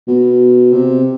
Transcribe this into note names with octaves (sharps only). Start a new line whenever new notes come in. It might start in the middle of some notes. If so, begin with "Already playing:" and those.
B2
C3